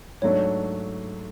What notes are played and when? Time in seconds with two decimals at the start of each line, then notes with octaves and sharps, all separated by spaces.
0.22 G#2 F#3 A3 D4 C#5